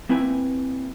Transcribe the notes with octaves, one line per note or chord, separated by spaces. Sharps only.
A#3 C4 E4 B4 G5 G#5